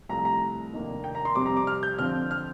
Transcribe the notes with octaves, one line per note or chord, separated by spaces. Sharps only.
C2 C3 F3 A3 A#5
A#5
F1 D#2 D#3 A#3 D4
G5
A#5
C6
F2 C3 G3 C4 D6
A#5
D6
F6
G6
F2 D3 F3 C4 F6
F6